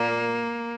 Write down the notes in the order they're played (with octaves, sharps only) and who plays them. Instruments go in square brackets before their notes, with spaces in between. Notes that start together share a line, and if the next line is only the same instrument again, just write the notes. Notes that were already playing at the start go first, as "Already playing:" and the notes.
Already playing: [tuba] A#2 [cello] A#3